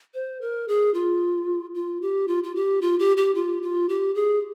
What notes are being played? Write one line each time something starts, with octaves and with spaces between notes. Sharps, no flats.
C5
A#4
G#4
F4
F4
G4
F4
F4
G4
F4
G4
G4
F4
F4
G4
G#4